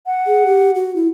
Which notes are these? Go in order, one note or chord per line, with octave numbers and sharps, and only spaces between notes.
F#5
G#4
G4
F#4
E4